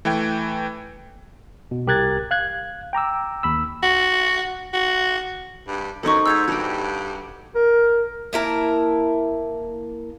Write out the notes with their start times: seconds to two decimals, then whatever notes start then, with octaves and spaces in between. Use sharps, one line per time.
0.05 E3 A3 B4 G5 G#6
1.71 B2
1.87 C2 G4 A#4 F#6 G#6 A6
2.31 F5 F#6 G#6
2.93 G5 A#5 D6 E6
3.43 D#2 B5 E6
3.83 F#4
4.73 F#4
5.67 G2
6.03 F#2 D#4 A4 C5 C#6
6.26 G#2 E6 G6 G#6
6.48 G2 F#4 G4
7.55 A#4
8.33 A#3 E4 A#4 A5